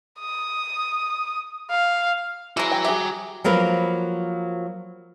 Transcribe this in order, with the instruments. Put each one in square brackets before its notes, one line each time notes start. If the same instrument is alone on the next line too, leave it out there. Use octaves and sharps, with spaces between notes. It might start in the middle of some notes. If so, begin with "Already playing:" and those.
[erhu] D#6
F5
[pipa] E3 G#3 [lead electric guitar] F#4 A#5
[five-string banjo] G5
[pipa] G4 [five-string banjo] G#4 E5
[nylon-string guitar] F3 F#3 A#3 A#4 B4